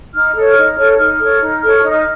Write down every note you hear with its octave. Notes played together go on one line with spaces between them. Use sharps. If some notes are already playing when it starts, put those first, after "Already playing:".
D#4 F6
A4 C#5
D#4
A4 C#5
D#4 F6
A4 C#5
D#4
A4 C#5
D#4